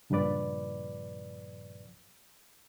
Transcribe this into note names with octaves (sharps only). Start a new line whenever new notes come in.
C#2 G2 A#2 F3 B4 D5